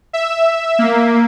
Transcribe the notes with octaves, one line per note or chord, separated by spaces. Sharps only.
E5
A#3